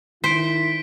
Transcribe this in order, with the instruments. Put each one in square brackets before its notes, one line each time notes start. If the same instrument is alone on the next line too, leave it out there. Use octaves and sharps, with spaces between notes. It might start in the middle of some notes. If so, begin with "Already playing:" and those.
[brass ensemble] D#3 E4 [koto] C5 [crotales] B6 D7